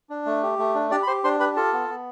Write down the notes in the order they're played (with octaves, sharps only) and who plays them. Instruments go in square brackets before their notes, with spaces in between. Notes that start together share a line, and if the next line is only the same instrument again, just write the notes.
[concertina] D4
A3
G4
A3
D4
D4 G4 D5
B5
G4 C5 C6
D4 C5 C6
G4 B4 B5
F4 A4 A5
B3
B3